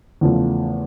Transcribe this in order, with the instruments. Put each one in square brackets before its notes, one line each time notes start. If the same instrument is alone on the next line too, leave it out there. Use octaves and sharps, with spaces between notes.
[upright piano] E2 C#3 F3 A3